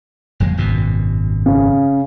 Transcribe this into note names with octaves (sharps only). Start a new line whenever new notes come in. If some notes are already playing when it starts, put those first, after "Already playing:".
F#1 F2 G#3
G#1 F#2 B2
C#3